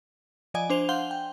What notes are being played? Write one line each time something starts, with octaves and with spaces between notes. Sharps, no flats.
F3 D5 D#5 G#5
D4 C5 F7 G7
F5 F#5 C6 G6 G7
G5